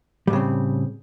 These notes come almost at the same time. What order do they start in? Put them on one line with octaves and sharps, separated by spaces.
G3 A2 C#3 C4